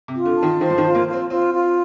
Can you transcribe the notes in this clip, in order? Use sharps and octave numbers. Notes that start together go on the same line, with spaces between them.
C3
F4
D3
A5
D#3
D#3 C5
F3
D#3
F4
A#3
F4
C4
C4 F4
F4